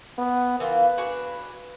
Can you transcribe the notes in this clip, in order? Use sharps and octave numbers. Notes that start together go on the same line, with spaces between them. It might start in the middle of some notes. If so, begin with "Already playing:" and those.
B3
E3 A#3 F4 B4
D4 F#4 G#4